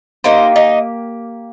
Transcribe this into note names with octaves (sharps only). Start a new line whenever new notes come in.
A#3 D#4 G4 C5
D#4 D#5